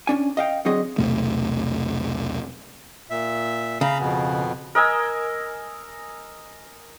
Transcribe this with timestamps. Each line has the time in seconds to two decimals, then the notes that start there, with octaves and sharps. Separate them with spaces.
0.07 C#4 D4 G#5
0.37 D#5 F5 G5
0.65 D3 F#3 C4 G#4 D#5
0.98 B1 E2 C3 A3
3.10 A#2 E5
3.81 C#3 F5 A#5 B5
3.99 F2 B2 B3
4.75 A#4 D#5 G#5 E6